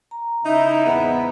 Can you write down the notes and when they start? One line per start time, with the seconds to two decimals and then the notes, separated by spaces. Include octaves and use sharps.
0.11 A#5
0.45 C#3 D#4 E4 E5
0.85 E2 G#2 B3